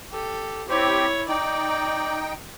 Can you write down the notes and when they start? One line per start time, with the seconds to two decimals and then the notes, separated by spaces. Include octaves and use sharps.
0.12 G4 A4
0.69 C4 E4 G4 C#5
1.29 D#4 D5 G5